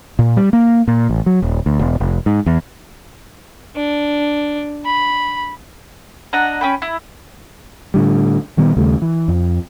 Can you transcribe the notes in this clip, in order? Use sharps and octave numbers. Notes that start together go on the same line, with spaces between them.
A#2
G3
A#3
A#2
A1
F#3
D#1
D2
E1
F1
G#2
E2
D4
B5
D4 D#5 F#5 A#5
C#4 G5 B5
E4
A2 D3 G3
A#2 D#3 G3 B3
D#2 C#3 G3 A3
E3
F2